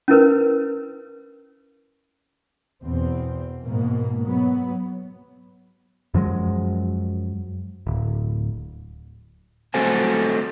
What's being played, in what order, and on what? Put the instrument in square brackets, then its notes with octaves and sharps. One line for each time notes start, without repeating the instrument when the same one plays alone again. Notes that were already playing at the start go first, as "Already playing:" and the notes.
[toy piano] C#4 E4 A#4 B4
[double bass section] E2 B2 C4
G#2 B2 A#3
F#3 B3
[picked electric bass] F#2 F3 F#3 G#3
D1
[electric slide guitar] A3 C4 F#4 A4 C5 G#5